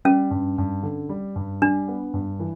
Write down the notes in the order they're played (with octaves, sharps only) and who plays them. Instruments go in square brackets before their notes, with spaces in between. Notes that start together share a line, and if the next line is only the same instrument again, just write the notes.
[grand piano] G3 [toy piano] C#4
[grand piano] G2
G2
D3
G3
G2
[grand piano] G3 [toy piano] D4
[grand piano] B3
G2
E3